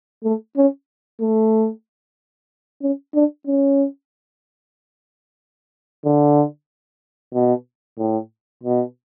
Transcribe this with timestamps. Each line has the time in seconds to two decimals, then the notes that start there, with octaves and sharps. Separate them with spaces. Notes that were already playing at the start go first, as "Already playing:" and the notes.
0.24 A3
0.57 C#4
1.21 A3
2.82 C#4
3.14 D4
3.47 C#4
6.05 D3
7.34 B2
7.98 A2
8.63 B2